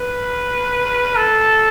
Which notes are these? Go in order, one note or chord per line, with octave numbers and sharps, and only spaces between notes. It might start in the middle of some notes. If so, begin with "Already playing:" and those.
Already playing: B4
A4